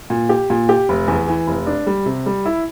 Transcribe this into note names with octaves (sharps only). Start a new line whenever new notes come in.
A#2
G4
A#2
G4
F1
E2
E3
F1
D4
G3
C3
G3
E4